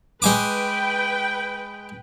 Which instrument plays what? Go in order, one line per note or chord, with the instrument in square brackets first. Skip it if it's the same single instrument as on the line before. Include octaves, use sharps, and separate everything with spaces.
[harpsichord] G#3 G#5 D6 [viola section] B4 G5